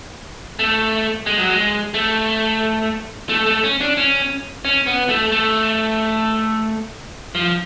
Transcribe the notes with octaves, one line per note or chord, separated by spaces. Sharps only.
A3
G#3
F#3
G#3
A3
A3
A3
C#4
D4
C#4
C#4
B3
A3
A3
F3